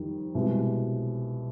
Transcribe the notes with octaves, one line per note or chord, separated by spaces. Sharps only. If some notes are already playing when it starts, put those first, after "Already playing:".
Already playing: F2 D#3 G3
C2 B2 G#3